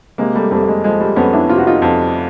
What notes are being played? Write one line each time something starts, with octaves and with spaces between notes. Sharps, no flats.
C3 G#3 A#3
G3 A3
F2 G3 A3
A3
G#3
F3 G#3
G3 A3
F2 B3 C#4
D4 E4
C3 F4
F#4
D#4 F4
F2